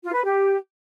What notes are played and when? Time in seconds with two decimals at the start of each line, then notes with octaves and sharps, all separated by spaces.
0.04 F4
0.14 B4
0.24 G4